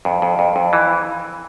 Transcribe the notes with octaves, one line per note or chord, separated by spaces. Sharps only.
F2
F2
F2
F2
E3